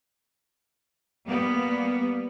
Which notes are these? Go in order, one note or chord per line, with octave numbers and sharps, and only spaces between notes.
G3 A#3 B3